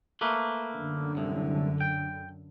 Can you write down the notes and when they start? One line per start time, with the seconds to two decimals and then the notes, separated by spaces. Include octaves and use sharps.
0.21 A3 A#3 B4
0.74 F#2 D3
1.17 C2 A2
1.81 G5